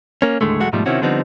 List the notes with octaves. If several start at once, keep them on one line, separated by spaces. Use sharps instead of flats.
A#3 C#4
D#2 A2 D3 G#3 A3
B1 E2 G#3 A3 F#4 F#5
G#2 B2 F3 G3 A3
C3 D#3 C4 C#4 E4 F#4
D3 F3 G3 B3 C4 D#4